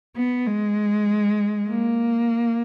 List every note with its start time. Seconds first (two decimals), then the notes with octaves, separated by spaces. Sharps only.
0.16 B3
0.47 G#3
1.69 A#3